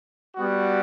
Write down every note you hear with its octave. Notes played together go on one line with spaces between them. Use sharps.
G3 B3 F#4